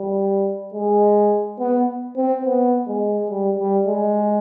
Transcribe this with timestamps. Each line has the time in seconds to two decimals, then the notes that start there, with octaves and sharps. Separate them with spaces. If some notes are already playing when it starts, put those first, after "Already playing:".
Already playing: G3
0.74 G#3
1.59 B3
2.16 C4
2.45 B3
2.87 G#3
3.30 G3
3.59 G3
3.87 G#3